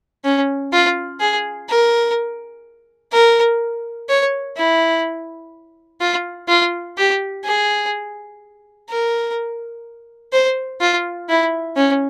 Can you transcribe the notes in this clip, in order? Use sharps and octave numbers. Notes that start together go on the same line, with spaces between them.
C#4
F4
G#4
A#4
A#4
C#5
E4
F4
F4
G4
G#4
A#4
C5
F4
E4
C#4